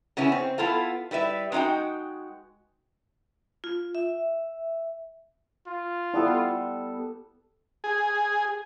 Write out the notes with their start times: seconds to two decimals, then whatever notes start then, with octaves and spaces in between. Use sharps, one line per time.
0.17 C#3 B3 C#4 E4
0.32 C4
0.58 B3 E4 F4 A4 F5
1.11 G3 E4 B4 E5
1.52 G#3 D#4 E4 F#4 G5
3.64 F4
3.95 E5
5.67 F4
6.14 G3 B3 E4 A4 D5 A5
7.84 G#4